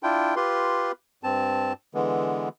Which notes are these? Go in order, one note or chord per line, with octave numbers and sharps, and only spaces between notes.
D4 E4 F4 G5
F4 G4 B4 C6
G2 C4 A5
D3 E3 G#3 B3